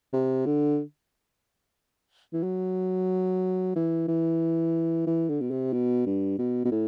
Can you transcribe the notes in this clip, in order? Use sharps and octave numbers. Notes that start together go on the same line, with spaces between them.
C3
D3
E3
F#3
E3
E3
E3
D3
B2
C3
B2
G2
B2
B2
A2